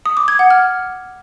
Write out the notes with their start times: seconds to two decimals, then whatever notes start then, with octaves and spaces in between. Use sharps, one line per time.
0.06 D#6
0.17 D6
0.28 G#6
0.39 F#5
0.50 F6